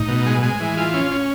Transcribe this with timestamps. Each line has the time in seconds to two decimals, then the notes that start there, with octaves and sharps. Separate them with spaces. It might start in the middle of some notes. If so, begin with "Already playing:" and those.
Already playing: A2 D#4
0.08 B2
0.26 G#3
0.43 G#3
0.61 E3
0.77 F4
0.93 C#4
1.11 C#4